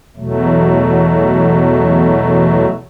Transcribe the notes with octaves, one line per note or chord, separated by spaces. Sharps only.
E2 B2 F#3 A3